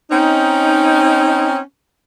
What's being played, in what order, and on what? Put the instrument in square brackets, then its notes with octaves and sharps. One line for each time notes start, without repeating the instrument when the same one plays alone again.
[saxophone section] C4 C#4 D#4